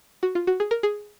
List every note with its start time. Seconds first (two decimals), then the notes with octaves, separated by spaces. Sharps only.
0.23 F#4
0.35 F4
0.47 F#4
0.60 G#4
0.71 A#4
0.83 G#4